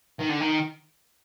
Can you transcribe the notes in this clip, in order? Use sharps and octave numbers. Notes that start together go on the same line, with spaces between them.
D#3
D3
D#3